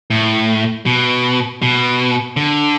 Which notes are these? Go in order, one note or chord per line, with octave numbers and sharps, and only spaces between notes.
A2
B2
B2
D3